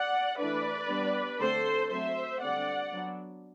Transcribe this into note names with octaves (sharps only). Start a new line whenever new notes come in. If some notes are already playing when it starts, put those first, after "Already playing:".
Already playing: D5 F#5
E3 A3 D4 B4 D5
G3 B3 D4
D3 A3 C4 A4 C5
F#3 A3 C4 C5 E5
D3 G3 C4 D5 F#5
F#3 B3 D4